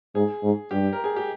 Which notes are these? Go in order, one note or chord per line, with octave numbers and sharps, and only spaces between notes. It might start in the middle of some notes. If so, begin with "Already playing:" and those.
G#2 G#4
G#2
G2 G4
A#4
G#4
G4